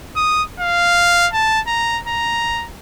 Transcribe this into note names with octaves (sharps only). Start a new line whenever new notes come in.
D#6
F5
A5
A#5
A#5